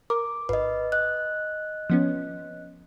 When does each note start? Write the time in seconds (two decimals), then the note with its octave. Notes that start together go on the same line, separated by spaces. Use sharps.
0.10 A#4 D6
0.49 G#1 B4 D#5
0.92 D#5 F#6
1.90 F3 B3 C#4